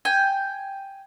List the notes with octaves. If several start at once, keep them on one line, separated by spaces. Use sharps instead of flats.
G5 G#5